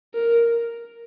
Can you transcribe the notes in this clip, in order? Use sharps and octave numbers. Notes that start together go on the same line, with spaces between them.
A#4